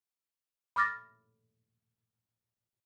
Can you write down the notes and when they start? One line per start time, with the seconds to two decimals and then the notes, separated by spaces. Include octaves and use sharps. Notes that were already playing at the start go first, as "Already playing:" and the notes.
0.76 B5 D6 F6 A6 A#6